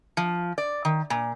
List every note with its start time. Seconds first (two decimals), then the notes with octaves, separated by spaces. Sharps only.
0.17 F3
0.58 D5
0.85 D#3
1.10 A#2